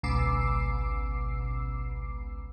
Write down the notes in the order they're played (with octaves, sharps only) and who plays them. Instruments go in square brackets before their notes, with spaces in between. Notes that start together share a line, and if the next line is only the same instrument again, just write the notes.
[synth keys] G#1 C#2 B2 D6 E6 C7